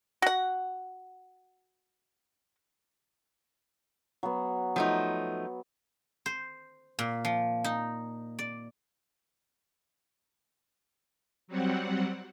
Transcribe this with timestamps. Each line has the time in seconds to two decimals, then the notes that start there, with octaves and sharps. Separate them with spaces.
0.22 F#4 F#5
4.23 F#3 B3
4.76 F3 F#3 A3 D#4
6.26 C5
6.99 A#2
7.25 F3
7.64 D#4
8.39 D5
11.48 F#3 G3 C4 F#5